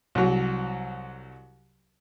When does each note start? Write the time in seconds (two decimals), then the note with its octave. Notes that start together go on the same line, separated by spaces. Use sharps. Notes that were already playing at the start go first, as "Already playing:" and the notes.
0.15 C2 F#3